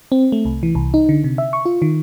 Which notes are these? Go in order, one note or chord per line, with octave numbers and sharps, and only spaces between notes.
C4
A3
C2
E3
C2
D#4
D3
C3
E5
C#6
F4
D#3